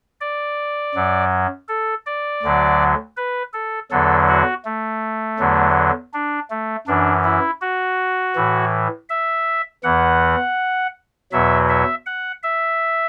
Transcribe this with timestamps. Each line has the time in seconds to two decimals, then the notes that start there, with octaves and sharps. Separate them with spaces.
0.21 D5
0.95 F#2 F#3
1.69 A4
2.06 D5
2.43 D2 D3 F#3
3.17 B4
3.54 A4
3.91 E2 D3 F#3 A4
4.28 F#4
4.65 A3
5.39 E2 D3 F#3
6.14 D4
6.50 A3
6.87 F#2 E3 D4
7.25 E4
7.61 F#4
8.36 A2 E3
9.09 E5
9.84 E2 E3 F#5
11.32 E2 B2 F#3 E5
11.69 E5
12.06 F#5
12.43 E5